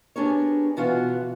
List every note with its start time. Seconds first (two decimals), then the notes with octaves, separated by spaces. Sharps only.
0.16 B3 D4 G4 G#4 A#4 C#5
0.76 B2 E3 B3 F4 F#4 F5